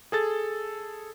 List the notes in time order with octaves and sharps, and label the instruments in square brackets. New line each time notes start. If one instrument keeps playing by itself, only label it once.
[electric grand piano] G#4 A4 A6